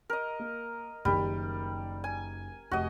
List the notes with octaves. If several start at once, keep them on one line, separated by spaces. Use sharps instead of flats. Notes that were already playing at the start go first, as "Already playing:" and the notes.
A#4 D#5
A#3
F#1 D#3 G3
G#5
F1 F#4 D#5